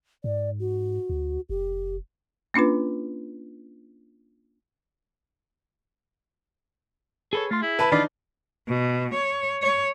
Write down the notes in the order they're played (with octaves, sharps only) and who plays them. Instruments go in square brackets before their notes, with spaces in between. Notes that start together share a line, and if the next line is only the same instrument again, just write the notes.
[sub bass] G#2 [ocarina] D5
[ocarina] F#4
[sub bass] D2
[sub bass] F1 [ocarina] G4
[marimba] A#3 C#4 D4 F4 B4
[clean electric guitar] G#4 B4 C#5 [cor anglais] A4
[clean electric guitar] A3 C6 [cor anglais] F4
[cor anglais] E4 [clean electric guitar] G#4
[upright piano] B4 A5 B5
[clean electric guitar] D#3 E3 B5 [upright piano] D4 D#4 D5 [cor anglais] F4
[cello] B2
C#5
C#5